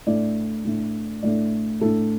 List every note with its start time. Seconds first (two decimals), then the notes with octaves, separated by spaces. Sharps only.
0.07 A2 A3 D4 D5
0.65 A2 A3 D4
1.23 A2 A3 D4 D5
1.81 A2 A3 D4 A4